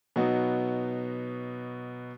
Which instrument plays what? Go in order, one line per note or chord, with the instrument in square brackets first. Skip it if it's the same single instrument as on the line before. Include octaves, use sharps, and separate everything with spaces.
[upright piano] B2 F#3 B3 D#4 F#4